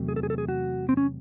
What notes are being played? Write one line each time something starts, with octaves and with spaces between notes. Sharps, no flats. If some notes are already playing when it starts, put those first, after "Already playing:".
Already playing: E2 C3 F#3 A3
G#4
A4
G#4
A4
G#4
F#4
C4
C#4